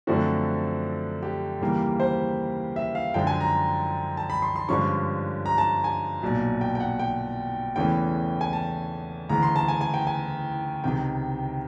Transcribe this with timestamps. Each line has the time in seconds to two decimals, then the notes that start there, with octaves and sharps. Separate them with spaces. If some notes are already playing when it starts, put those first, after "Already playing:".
0.07 F#2 D3 F3 A3 C4 F#4
1.23 G4
1.61 D#2 C#3 E3 G3 A#3
2.00 C5
2.76 E5
2.95 F5
3.14 F#2 D3 F3 G#3 G5
3.27 G#5
3.40 A#5
4.17 A5
4.30 B5
4.42 C6
4.56 C6
4.68 G2 D3 F3 G#3 C#4 C#6
5.46 A#5
5.58 A5
5.84 G#5
6.22 B1 A#2 F#3
6.61 G5
6.75 G5
6.80 F#5
6.99 G5
7.76 E2 C#3 E3 A3 C#4 G5
8.41 G#5
8.53 A5
9.29 D2 C#3 E3 A#5
9.43 C6
9.56 A5
9.68 G#5
9.81 G#5
9.94 G5
10.07 G#5
10.84 C#2 C3 D#3 G5